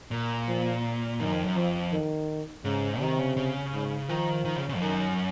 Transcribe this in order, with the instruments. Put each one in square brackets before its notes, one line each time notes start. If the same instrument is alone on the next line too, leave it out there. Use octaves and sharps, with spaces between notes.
[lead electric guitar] A#2
[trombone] F3
[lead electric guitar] F#2 [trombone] D#3
[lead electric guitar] F2
F#2
[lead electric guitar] F2 [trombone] F3
[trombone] D#3
[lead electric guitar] G#2 [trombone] C#3
[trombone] C3 [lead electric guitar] D#3
[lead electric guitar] C#3
C#3
[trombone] G#2
[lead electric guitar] D#3 [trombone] F3
[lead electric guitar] D#3
C#3
C#3
F2
[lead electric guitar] F#2 [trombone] D#3